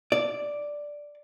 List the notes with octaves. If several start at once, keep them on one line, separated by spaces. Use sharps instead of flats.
D5